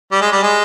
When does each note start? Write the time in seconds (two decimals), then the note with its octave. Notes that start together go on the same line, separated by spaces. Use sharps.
0.12 G3
0.21 G#3
0.32 G3
0.43 G#3